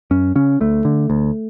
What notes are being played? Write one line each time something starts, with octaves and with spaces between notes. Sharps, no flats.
F#2 C#4
C#3 C#4
D2 A3
D3
D2